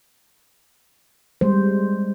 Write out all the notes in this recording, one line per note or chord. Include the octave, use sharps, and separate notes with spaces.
G3 G#3 C5